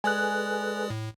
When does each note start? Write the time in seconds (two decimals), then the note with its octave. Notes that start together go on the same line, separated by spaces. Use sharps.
0.04 G#3 G#4 A4 B4 D5 G#5 D#6 F#6
0.90 A2